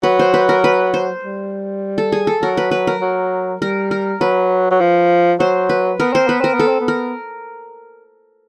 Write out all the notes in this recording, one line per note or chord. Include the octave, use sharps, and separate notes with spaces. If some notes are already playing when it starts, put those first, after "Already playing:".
F#3 B4
C5
B4
A#4
B4
C5
G3
A4
G#4
A4
F#3 A#4
B4
B4
A#4
F#3
G3 A#4
A#4
F#3 B4
F#3
F3
F#3 C5
B4
B3 A#4
C4 C5
B3 B4
C4 A#4
B3
A4
C4
B3
A#4